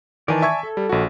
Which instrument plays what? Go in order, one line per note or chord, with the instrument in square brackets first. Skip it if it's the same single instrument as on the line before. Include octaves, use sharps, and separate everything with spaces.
[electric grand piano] D#3 E3 [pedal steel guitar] D5 G#5 A5
[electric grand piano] E5 C#6 G#6
[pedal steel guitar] A4
[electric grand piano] G3
A#1 F#4